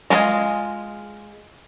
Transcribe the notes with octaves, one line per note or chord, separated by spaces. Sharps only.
G#3 F4 A#4 D#5 G#5